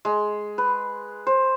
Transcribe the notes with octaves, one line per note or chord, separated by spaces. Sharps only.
G#3
B4
C5